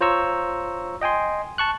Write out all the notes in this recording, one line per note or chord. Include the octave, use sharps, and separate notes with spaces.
F4 C5 C#5 A#5 C#6 E6
D#5 G5 G#5 C6
A5 C#6 F#6